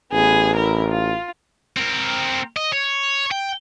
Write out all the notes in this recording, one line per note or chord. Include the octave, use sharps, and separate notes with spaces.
A1 B3 G#4
E4 A#4
F4
C4 A#4
D#5
C#5
G5